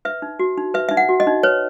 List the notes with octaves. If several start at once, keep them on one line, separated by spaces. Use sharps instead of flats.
B4 E5
D#4
F#4
D#4
B4 E5
D#4 E5
F#5
F#4
D#5
D#4
B4 C#5